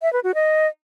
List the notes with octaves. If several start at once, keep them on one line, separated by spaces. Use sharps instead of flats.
E5
B4
F#4
D#5